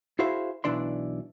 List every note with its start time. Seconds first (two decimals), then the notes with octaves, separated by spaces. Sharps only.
0.19 E4 F#4 G#4 C5 E5 F5
0.64 B1 B2 E3 D4 D5 C6